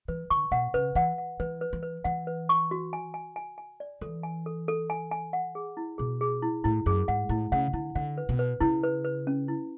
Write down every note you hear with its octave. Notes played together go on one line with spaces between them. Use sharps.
E3 B4
D3 C#6
B2 F#5
C#3 B4
E3 F#5
F#5
E3 B4
B4
E3
B4
E3 F#5
B4
C#6
F#4
G#5
G#5
G#5
G#5
D5
E3 A4
G#5
A4
A4
G#5
G#5
F#5
G#4
E4
B2 G#4
G#4
E4
A2 E4
F#2 G#4
G#2 F#5
A2 E4
C#3 F#5
D3 E4
D3 F#5
B4
B2
B4
C#3 E4
B4
B4
C#4
E4